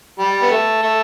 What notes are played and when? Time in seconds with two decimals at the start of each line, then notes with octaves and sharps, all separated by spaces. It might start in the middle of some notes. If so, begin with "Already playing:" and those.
0.19 G3
0.42 B3
0.51 A3
0.82 A3